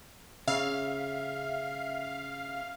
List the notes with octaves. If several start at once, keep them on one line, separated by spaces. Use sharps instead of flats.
C#3 E5 F5